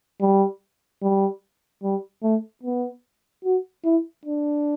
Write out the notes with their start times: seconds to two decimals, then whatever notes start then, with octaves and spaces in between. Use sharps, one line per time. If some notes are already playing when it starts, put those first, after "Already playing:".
0.21 G3
1.03 G3
1.83 G3
2.23 A3
2.64 B3
3.44 F#4
3.85 E4
4.26 D4